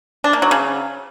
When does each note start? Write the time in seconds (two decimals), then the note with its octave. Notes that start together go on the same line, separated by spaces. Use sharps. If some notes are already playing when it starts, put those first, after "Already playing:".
0.24 D4
0.33 A#3
0.42 F#3
0.51 C#3